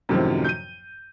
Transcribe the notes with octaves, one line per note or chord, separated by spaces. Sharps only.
F#2 A2 C3 D#3 F3 F#3
G6 D#7